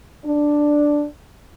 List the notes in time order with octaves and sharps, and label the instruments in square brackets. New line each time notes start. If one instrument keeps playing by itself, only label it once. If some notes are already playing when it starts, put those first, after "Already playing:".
[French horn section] D4